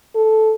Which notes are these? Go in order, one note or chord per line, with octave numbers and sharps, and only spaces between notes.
A4